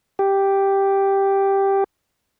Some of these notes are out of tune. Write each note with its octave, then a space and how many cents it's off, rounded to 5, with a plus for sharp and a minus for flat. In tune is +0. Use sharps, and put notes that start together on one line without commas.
G4 +0